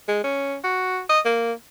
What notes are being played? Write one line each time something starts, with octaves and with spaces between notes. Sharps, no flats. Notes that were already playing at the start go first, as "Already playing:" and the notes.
G#3
C#4
F#4
D#5
A#3